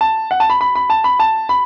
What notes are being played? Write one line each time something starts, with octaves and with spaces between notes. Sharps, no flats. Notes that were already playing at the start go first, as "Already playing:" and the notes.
A5
F#5
A5
B5
B5
B5
A5
B5
A5
B5